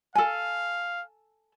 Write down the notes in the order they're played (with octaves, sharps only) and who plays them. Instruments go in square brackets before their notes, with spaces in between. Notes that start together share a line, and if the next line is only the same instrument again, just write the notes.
[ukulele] A4 G#5 [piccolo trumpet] F5